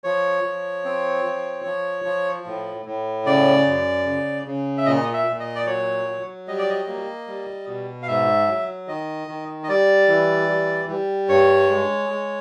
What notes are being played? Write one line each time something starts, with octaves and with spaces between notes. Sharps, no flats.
F3 C#5
F3
C4
F3
F3
F3
A2
A2
C#3 D5
F#2
C#3
C#3
E5
A#2 D#5
E5
A#2
D#5
D5
F#3 C#5
F#3
G3 D#5
D5
D#5
A#3
G3
B2
F5
G#2 E5
F#3
D#3 D#5
D#3
D#5
G3 D5
E3
G3
G3
G2 C#5
G#3
G#3